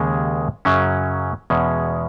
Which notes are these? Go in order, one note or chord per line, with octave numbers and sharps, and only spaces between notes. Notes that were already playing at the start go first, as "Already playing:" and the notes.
Already playing: D#2 C#3 G#3
F#2 C#3 F#3 C#4
E2 B2 G#3 C#4